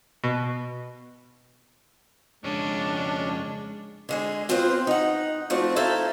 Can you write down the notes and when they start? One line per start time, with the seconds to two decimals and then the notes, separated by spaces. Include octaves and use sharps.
0.24 B2
2.44 F2 C#3 G#3 C#4 D4
4.09 D3 G#3 G#4
4.49 B3 C4 F4 G#4 B4 C5
4.87 D#4 F#5
5.50 F3 A3 C4 F#4 D5
5.76 D#4 E4 A4 C5 E5 F5